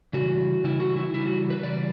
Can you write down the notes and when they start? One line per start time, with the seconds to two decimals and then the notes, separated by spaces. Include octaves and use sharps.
0.13 C#3 E3 G3 F#4
0.64 C#3 E3 G3 E4
0.80 F#4
0.96 E4
1.14 C#3 E3 G3 E4
1.26 F#4
1.50 B4
1.63 C#3 E3 G3 D5